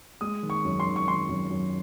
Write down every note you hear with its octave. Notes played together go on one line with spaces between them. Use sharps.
G#3 D#6
D#3
C#6
F#2
C6
D#3
C#6
D#3 C6
F#2
F#2